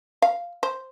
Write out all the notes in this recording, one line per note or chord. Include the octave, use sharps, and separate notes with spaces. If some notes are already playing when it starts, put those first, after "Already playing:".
F5
C5